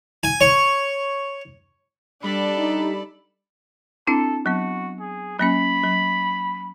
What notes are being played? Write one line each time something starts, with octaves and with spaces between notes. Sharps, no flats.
G#5
C#5
G3 D4 A4 D5 B5
D#4
C4 D4 E4 A4
F#3 B3 F#4
G#4
F#3 A#3 C#4 B5
F#3